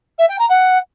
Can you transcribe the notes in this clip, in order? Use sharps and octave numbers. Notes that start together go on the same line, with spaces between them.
E5
G5
A#5
F#5